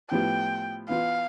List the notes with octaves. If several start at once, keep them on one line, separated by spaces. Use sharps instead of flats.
A2 F3 B3 E4 G4 G5
E3 B3 F4 F5